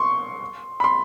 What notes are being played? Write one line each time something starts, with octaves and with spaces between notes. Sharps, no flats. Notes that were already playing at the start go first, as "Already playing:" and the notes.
Already playing: C6 C#6
B5
C6